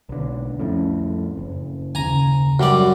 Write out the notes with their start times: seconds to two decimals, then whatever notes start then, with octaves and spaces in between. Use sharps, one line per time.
0.09 B1 D3
0.60 F2 A2 C#4
1.37 F#1
1.95 D#2 C#3 G#5 A#5
2.60 F#2 G3 F#4 D5